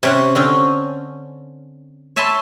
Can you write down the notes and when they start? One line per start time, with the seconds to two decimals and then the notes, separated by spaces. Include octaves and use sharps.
0.03 C3 C#4 F#5
0.35 D3 C4 C#4
2.16 C#5 E5 G#5 A5 B5 C6